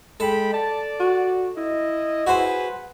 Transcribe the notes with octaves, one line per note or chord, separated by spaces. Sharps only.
G#3 A4 G5 B5
D5 A5
F#4
E4 D#5
F#4 G#4 B4 C5